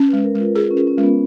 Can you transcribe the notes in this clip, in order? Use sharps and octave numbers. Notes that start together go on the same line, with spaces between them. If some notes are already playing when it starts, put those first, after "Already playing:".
Already playing: C#4
B4
G#3
A#4
G#3 F4
F4 G#4
C#4
G#4
C#4
G#3
B3